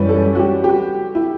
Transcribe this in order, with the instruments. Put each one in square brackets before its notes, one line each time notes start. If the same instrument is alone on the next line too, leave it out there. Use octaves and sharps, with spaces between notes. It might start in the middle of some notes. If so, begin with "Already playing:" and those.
Already playing: [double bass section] F#2 E3 G3 C#4 [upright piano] B4
[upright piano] A4
F#4
G4
G4
F#4
E4